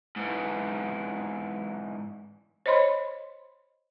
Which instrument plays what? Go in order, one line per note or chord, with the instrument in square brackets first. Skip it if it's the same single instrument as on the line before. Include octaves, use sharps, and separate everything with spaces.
[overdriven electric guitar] G#2 E3
[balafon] C5 C#5 D#5 B5 C6